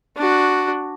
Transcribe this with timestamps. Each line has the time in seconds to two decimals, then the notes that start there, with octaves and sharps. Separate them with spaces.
0.16 D4 F#4